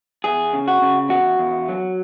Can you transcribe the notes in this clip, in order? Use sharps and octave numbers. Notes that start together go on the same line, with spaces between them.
E2 G#4
C#3
F#4
C#3
E2 F#4
E2
F#3